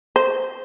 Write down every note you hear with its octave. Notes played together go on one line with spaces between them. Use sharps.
C5